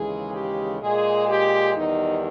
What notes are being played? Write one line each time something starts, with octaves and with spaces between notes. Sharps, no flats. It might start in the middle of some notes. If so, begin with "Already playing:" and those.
Already playing: D#2 C#3 E3 G#3 G#4
G4
A#2 G#3 G#4
G4
E2 D#3 G3 D#4